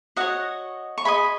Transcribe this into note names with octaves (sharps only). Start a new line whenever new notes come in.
F#4 C#5 D#5 F#5
C#6
G#4 B4 D#5 G#5 B5